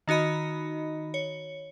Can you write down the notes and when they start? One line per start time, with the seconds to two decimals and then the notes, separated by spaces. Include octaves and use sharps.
0.08 D#3 D#4 F#4 D#5 B5
1.14 C#5